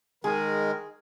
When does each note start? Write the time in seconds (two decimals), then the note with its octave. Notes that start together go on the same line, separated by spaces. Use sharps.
0.24 D#3 G#3 G#4 A#4